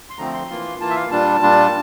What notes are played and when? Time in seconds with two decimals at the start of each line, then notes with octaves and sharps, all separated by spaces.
0.10 C6
0.18 D3 F3 A3 C4 A#5
0.34 C6
0.50 E3 A#3 F4
0.80 E3 A#3 F4 A5
0.90 E5
0.96 F5
1.11 A#2 G3 D4 F4 A5
1.42 A#2 G3 D4 F4